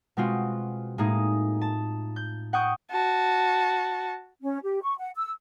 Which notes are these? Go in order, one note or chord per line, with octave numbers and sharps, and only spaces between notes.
B2 G#3 C4 F4 F#4
A2 G#3 A#3 D#4 G#4
A5
G6
F#5 G5 C#6 D#6 G6
F#4 A5
C#4
G4
C#6
F#5
E6